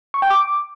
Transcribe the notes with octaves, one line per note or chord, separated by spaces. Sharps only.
C#6
G5
D6